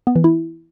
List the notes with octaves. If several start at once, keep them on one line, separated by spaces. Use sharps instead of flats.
B3
E3
E4